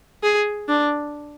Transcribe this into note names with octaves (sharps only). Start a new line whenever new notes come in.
G#4
D4